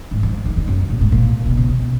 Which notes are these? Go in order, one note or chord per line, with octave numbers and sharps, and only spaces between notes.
G#2
F3
D#3
F2
F#2
A#2
G#2
A#2
B2
C#3
B2